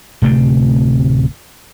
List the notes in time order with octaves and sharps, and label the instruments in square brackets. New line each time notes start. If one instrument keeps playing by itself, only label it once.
[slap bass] D1 C3 A3 C4